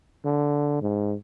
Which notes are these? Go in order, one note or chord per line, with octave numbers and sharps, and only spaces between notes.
D3
G#2